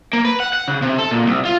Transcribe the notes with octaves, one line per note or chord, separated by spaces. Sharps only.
A#3
B4
F#5
F#5
C#3
C3
A4
A#2
C2
F4